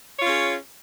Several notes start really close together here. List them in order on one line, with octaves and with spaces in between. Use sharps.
C#5 F4 C#4 G#4